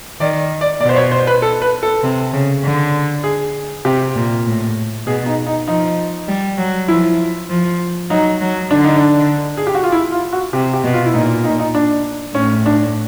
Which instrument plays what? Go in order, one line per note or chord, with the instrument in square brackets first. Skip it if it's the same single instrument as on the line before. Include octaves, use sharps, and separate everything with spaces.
[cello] D#3 [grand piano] D5
[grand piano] D5
[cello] B2 [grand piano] D5
[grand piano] C5
C#5
C5
B4
A4
B4
A4
[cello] C3
C#3
D3
[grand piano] G#4
[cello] C3 [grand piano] G4
[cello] A#2
A2
[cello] B2 [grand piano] G#4
[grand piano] D#4
D#4
[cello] F3 [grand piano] D#4
[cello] G3
F#3
[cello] F3 [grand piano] E4
[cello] F3
[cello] F#3 [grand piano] D#4
[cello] F#3
[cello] D3 [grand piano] D4
[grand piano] D#4
D4
G#4
G4
F#4
F4
E4
F4
F#4
[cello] C3 [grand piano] G4
[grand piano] G4
[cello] B2
[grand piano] F4
E4
[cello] A#2 [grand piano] D#4
[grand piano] D#4
D#4
D4
[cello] A2 [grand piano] C#4
[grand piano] D4